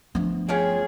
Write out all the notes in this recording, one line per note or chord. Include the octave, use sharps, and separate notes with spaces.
G1 F3 A3 B3 D4
C#4 F4 G#4 G5